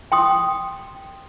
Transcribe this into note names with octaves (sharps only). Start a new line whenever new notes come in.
G5 C6 D#6